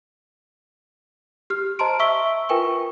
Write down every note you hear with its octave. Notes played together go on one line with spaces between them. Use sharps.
G4 F6
C5 D#5 A5 A#5 C6 D7
E5 C#6 E6 B6 G7
F4 A#4 B4 G5 G#5 C#6